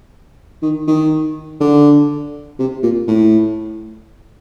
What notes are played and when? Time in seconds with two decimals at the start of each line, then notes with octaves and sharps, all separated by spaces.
0.62 D#3
0.87 D#3
1.61 D3
2.59 C3
2.83 A#2
3.07 A2